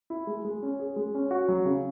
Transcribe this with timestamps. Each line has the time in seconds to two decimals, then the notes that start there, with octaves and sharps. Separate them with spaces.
0.10 E4
0.27 G#3
0.45 G#3
0.63 C#4
0.80 G#4
0.96 G#3
1.15 C#4
1.31 F#4
1.48 F#3
1.65 C#3